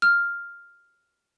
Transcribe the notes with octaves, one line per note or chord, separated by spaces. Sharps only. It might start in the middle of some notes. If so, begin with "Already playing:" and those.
F6